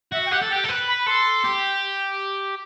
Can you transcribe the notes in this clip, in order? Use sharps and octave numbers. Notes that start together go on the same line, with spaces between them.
F#4 E5
G5
G4 F#5
A4
G4 G5
A4
B4
B5
A4 C6
G4